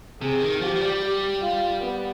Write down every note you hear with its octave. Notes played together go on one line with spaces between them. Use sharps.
C3 G#4
D#3
F3 G4
F3
G3
G4
F4
B3